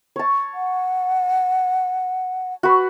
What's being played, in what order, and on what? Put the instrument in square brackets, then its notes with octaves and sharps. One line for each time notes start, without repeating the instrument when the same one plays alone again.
[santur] C#5 A5
[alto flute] F#5
[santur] F#4 B4